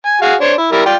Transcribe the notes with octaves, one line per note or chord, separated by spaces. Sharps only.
G#5
F#4 G#4 F5
D4 C5 C#5
E4
G3 E4 A#4
F4 D5 G5